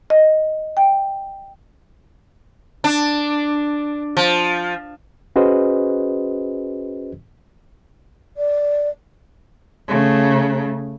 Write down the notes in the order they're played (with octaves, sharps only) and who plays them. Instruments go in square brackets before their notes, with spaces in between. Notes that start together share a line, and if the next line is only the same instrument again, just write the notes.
[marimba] D#5
G5
[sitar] D4
F3
[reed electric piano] C#4 F#4 G#4 B4 C5 D#5
[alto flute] D5
[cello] C#3 A3